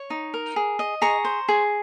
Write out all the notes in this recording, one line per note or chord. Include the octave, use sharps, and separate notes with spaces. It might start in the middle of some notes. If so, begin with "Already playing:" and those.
Already playing: C#5
D#4
A#4
G#4
D#5
G#4 A#5 C#6
C5
G#4